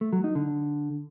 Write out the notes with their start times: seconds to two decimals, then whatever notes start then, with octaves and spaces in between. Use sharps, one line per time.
0.01 A3
0.13 F#3
0.24 D#4
0.35 D3